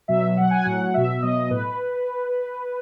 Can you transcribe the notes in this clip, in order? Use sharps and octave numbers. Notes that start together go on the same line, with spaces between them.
B2 F#3 E5
B2 F#3 F#5
G#5
A2 F#3 F#5
B2 F#3 E5
B2 F#3 D#5
A2 B4